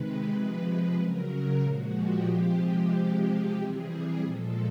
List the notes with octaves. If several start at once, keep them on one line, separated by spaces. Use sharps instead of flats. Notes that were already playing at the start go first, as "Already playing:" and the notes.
Already playing: C3 D#3 G#3 B4
C3 F3 G#3
C#3 F#3 A#4
A#2 F3 G#3 F#4
G4
C3 F3 G#3
C3 F3 G#3
C3 E3 G3 G#4
A#2 F3 G#3 A4